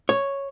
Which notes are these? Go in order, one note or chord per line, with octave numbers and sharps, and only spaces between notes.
C#5